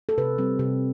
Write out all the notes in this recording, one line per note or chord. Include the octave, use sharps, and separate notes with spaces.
A4
C3 B4
G3 C4
C3